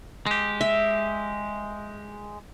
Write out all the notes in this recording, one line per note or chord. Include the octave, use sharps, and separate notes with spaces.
G#3 G4
E5